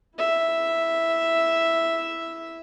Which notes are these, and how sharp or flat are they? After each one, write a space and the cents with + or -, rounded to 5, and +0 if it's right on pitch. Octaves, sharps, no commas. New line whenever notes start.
E4 +0 E5 +0